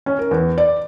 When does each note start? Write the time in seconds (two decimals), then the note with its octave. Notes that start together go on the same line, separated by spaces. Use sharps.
0.06 C#4
0.19 A#4
0.31 E2
0.58 D5